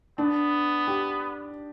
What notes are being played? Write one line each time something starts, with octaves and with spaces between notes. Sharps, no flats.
B3 D4
G4